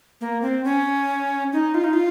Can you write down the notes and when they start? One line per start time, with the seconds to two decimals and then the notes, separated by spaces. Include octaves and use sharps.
0.21 A#3
0.42 C4
0.65 C#4
1.53 D#4
1.74 F4
1.84 D#4
1.93 F4